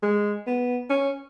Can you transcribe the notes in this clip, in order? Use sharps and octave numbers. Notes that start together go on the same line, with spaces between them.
G#3
B3
C#4